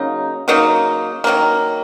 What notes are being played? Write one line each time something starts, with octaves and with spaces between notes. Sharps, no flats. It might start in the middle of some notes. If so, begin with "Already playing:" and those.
Already playing: C#3 F#3 A#3 D#4
C#3 F#3 A#3 D#4
D#3 F#3 A#3